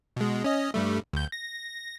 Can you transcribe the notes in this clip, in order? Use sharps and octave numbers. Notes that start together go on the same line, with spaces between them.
B2 G#3
C#4 D#5
G2 G3 A3
D2 G6
A#6